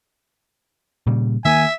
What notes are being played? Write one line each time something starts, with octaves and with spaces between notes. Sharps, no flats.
A#2 C#3 G3
D#3 A#3 E5 G#5